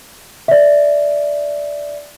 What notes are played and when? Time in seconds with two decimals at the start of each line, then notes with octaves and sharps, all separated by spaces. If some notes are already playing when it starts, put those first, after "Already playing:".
0.48 D5 E5